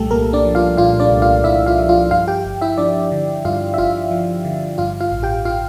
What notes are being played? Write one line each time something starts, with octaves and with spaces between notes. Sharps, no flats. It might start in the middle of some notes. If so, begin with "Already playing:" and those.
Already playing: C2 A#2 G3 A3 G4 A4
C2 A#3 A#4
D4 D5
F3
F4 F5
A#2 F4 F5
D4 D5
C2
F4 F5
C2 E4 E5
F4 F5
F3
F4 F5
G2 F4 F5
G4 G5
G1
E4 E5
F3 D4 D5
D3
G2 F4 F5
E5
G1 F4 F5
F3
D3
G2 F4 F5
F4 F5
A1
G4 G5
F4 F5